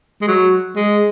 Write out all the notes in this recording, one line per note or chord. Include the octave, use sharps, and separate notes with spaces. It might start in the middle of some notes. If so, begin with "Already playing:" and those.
G#3
F#3
G#3